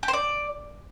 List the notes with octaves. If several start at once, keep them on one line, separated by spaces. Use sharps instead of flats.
G4
C5
D5